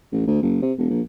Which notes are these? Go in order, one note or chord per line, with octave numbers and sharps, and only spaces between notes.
A1
D2
F#1
C3
E1
A#1